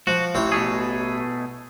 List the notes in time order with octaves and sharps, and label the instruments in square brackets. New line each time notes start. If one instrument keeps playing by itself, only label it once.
[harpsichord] F3 [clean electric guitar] F#4
[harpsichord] A1 E3 C#5 [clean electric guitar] C4
[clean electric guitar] B2 A3 G#4